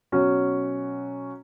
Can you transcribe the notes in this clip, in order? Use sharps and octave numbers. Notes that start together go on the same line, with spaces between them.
B2 F#3 C#4 F#4